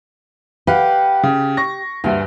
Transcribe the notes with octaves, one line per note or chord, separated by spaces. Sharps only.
G4 B4 F5 F#5
C#3
C#6 A#6
D2 G2 G#5